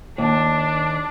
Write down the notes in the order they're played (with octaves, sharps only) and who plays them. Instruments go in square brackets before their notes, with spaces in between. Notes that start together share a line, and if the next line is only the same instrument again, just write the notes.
[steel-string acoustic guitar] D#2 [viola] D4